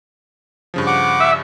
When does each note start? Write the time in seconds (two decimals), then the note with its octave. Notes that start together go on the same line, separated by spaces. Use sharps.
0.74 G2 C#3 F3
0.87 F#5 D6
1.20 E5